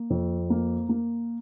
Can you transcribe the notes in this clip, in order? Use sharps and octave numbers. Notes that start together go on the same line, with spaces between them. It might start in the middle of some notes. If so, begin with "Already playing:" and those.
Already playing: A#3
F2
A#3
A#3